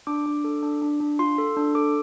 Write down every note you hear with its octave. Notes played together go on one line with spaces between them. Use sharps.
D4 D6
D4
A4
D4
D4
D4
F4 C6
A4
D4
A4 D6